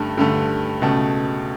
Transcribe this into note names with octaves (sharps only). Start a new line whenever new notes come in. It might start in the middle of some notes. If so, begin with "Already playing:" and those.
Already playing: G2 D3 A3
G2 D3 A3
C#2 B2 A3